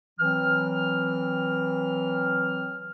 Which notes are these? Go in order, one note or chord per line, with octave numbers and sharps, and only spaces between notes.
E3 F#3 C4 F6